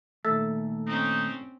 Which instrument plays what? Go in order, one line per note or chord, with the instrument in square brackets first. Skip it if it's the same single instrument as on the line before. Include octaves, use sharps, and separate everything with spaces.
[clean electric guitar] A#2 D#3 A3 [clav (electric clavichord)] A4 E5 A5
[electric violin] C4 C#4 [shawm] D#4